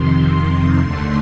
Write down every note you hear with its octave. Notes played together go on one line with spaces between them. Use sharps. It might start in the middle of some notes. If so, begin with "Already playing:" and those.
Already playing: F2 C3 D#3 C6
D#2 D3 A3 C6